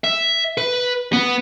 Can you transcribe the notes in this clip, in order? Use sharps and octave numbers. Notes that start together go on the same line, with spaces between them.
E5
B4
B3